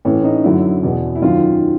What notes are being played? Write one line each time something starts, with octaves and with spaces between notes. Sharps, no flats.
A2 E3 C#4
D#4
F#2 D3 E4
E2 B2
E4
F#2 D#3 F4